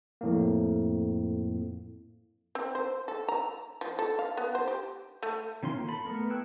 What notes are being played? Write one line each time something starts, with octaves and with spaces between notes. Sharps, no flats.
F2 A2 A#3
C4
C5
A4
A#5
F3
A4
F5
B3
C5
G4
A3
D#3 C#4 F4 C6
A#3
A4 B5
A3 B3 A#4
E4 G5 C#6 E6 F#6